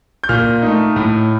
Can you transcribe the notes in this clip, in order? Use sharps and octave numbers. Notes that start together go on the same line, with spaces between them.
G6
A#2 F6
A3 D#4
A2